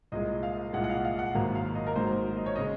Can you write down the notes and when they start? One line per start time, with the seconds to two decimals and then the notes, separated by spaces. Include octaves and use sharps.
0.12 C2 A#2 G#3 D#5
0.43 F5
0.73 C2 A#2 G#3 F#5
0.84 F#5
0.89 F5
1.05 F5
1.19 F#5
1.35 G#1 G#2 F#3 A#3 F5
1.55 F5
1.75 D#5
1.87 A#4
1.95 G#1 G#2 F#3 A#3 C5
2.36 D#5
2.46 C#5
2.56 C#3 G#3 D#5